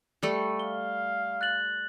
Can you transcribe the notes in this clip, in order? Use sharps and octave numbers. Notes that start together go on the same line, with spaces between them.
G3 A3
F5 G7
F#6 A6 F#7